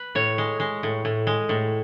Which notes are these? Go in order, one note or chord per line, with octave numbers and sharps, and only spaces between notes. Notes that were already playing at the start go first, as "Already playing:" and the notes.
Already playing: B4
A2 C#5
G#3
G#3
A2
A2
G#3
A2